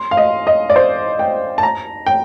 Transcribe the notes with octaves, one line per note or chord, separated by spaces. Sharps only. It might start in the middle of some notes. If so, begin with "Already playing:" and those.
Already playing: C6
F5
D#5
D#5
D5
C5
G5
A5
A#5
G5